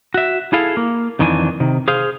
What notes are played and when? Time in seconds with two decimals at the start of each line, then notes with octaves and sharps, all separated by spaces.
0.14 F#4 E5
0.53 E4 G#4 A4 F5
0.77 A#3
1.19 F2 D#3 E3 D4 G#5
1.60 C3 D#3
1.88 G#4 C5 F5